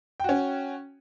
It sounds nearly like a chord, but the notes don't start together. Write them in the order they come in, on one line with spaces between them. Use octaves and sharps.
G5 F#4 C#4